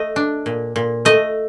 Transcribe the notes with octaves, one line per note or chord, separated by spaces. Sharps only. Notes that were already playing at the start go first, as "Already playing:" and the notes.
Already playing: A3 D#5
D4
A#2
A#2
A3 D#5